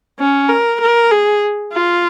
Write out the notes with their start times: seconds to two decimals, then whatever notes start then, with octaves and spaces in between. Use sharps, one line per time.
0.19 C#4
0.49 A#4
0.81 A#4
1.11 G#4
1.74 F4